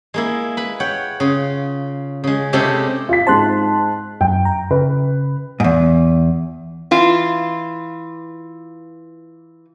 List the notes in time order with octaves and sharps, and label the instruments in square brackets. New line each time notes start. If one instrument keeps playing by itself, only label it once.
[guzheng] G#3 A#3 E4
B4 B5
C#5 F#5 G5
C#3 F4
C#3 G#3
C3 G#3 A3 C#4 G4 A4
[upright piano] F4 B6
[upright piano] G#2 C4 [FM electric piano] A5 C6 F#6
[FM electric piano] F#2 [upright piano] G5
[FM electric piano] A#5
[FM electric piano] C#3 [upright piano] B4
[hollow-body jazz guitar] E2 G#2
[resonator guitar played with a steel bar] E3 F4